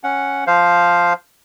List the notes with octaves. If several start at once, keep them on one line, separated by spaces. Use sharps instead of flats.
C#4 F#5
F3 C5 F5